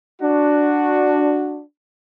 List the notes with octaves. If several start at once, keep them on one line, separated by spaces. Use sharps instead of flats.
D4 F#4